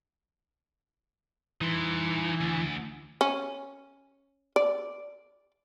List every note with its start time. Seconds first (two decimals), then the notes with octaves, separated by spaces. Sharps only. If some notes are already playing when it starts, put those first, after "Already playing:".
1.61 E3 D#4 C6
2.41 D2
3.21 C#4
4.56 D5